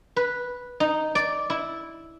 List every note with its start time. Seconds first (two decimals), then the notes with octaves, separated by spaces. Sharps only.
0.16 B4
0.80 D#4
1.15 D5
1.50 E4